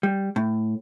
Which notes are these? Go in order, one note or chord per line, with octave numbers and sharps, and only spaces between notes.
G3
A2